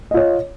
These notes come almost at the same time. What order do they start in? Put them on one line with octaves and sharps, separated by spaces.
D#5 F4 C#5